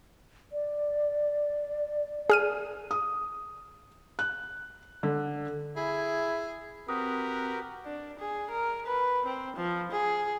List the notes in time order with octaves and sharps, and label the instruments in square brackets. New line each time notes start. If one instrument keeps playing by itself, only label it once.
[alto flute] D5
[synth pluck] G#4 F6 D#7
[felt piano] D#6
F#6
D3
[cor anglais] E4 [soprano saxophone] G#4
[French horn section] C4 [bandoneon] F#4 G4 B4 [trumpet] A#4 [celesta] D#6
[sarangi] D4
G#4
A#4
B4
C4
F3
G#4